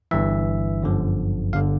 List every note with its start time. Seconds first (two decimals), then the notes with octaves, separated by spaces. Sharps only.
0.11 G1 G2 E3 E5
0.83 G1 F#2 D3 F3
1.53 G1 D3 F5